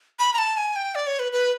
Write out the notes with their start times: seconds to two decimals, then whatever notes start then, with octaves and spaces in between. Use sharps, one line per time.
0.19 B5
0.33 A#5
0.38 A5
0.57 G#5
0.76 G5
0.95 D5
1.07 C#5
1.19 B4
1.32 B4